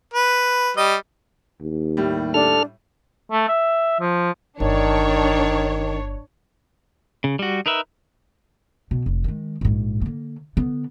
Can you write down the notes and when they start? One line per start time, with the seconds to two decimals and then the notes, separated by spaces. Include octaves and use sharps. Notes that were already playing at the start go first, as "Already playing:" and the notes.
0.14 B4
0.77 G3 D#5
1.61 D#2
1.97 A2 G3
2.34 D4 A4 F6
3.31 A3
3.48 E5
4.00 F3
4.60 G1 D#3 D4 C#5
7.24 C#3
7.39 G3 F#4
7.66 D#4 A#4 B4 E5
8.91 B2
9.06 F1
9.24 D#3 G#3
9.61 A#1 G#2
10.01 D3 A#3
10.57 D3 B3